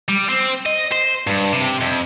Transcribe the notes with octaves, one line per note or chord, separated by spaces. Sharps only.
G3
C4
D#5
C5
G2
C3
F2